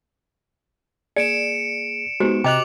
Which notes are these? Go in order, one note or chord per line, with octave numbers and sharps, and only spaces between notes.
A#3 G#4 D5 C#7 D7 E7
G#3 B3 D#4 F#4 G4 C5
C3 D#5 G5 A#5 D6 F#6 F7 F#7